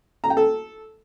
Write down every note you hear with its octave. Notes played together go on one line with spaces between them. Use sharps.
A#5
G5
A4